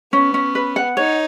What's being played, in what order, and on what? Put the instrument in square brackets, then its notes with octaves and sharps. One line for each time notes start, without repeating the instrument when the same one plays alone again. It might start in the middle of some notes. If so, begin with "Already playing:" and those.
[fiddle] B3 [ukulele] C#4
[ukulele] C#4
B4
F#5
[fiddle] D#4 [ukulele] C#5